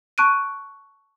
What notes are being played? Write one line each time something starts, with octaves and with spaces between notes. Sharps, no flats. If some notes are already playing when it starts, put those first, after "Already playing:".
A5 C#6 F#6 D7 D#7